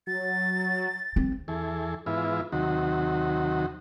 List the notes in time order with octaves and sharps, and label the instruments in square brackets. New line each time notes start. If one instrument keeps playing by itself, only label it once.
[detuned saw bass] F#3 [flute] A6
[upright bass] C4
[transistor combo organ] E2 E3 G#4 A4
G#2 E3 B3 E4 F4
D#2 C3 D#3 F#3 F#4